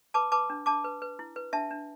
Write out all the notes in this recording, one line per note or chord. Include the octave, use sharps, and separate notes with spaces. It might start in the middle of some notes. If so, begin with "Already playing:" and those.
B4 A5 D6
B4 A5 D6
D4
D4 A5 D6
B4
B4
E4
B4
D4 E5 A5
D4